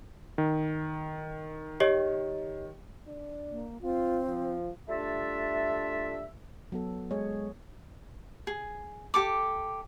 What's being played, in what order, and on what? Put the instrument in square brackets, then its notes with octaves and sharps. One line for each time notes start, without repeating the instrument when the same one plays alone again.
[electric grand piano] D#3
[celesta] G4 C#5 D#5
[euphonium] D4
[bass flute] A#3
[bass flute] C4 [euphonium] F4
[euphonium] F3
[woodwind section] G3 A3 D4 F4 E5
[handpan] F#3 B3 A4
[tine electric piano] G#3 [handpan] G#4 C#5
[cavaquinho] G#4
G4 A4 D6